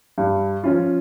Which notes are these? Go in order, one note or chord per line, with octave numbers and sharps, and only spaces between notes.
G2
F3 C#4 F4